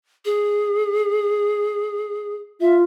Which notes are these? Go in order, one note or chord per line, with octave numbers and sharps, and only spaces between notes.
G#4
F4 E5